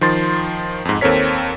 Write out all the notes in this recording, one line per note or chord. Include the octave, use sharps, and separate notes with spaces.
D#3 F3 C6 A6
F2 G#2
D#2 C4 A4 A#4 C#5 B6